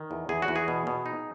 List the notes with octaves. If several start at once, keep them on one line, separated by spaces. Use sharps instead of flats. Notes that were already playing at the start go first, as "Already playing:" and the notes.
Already playing: D#3
E2
E2 G#4
F#4
E2
G#4
B2
B2
D#4